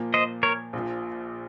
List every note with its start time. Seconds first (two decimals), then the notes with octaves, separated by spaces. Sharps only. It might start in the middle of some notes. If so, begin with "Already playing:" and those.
Already playing: A#2 F3 A#3
0.14 C5 D#5
0.43 A#4 C#5
0.73 A#1 A#2 F3